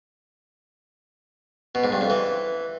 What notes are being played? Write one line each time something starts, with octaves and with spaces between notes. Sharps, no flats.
B2
G#2
G2
F2
E3